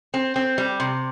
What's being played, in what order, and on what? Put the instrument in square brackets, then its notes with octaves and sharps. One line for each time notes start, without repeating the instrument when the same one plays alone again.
[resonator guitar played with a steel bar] C4
C4
G3
C3